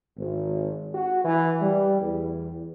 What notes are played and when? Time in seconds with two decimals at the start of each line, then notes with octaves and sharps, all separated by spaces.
0.18 G#1
0.95 F#4
1.25 E3
1.61 G3
2.02 E2